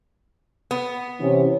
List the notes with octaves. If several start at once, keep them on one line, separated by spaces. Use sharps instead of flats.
B3
C3 E3 C#4